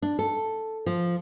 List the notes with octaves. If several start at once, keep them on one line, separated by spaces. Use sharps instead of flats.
D4
A4
F3